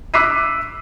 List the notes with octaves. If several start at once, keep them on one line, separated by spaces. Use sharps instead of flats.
D6 E6 F#6 B6 C7 D#7